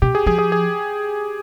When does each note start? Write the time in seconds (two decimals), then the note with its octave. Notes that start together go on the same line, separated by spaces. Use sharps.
0.02 B2 G4
0.15 G#4
0.26 F3 G#4
0.39 G#4
0.52 G#4